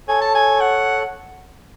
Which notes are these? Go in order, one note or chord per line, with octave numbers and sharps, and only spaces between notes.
A4 C#5 G#5
A5
G#5
F#5